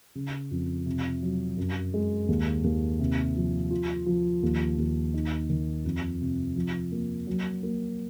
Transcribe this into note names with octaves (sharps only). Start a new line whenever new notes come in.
C#3
F2
C3
F#3
F#2
G#3
D#2
D#2
C3
F3
F4
F3
D#2
D#2
D#4
D#3
F2
C3
F3
A#3
F#3
A#3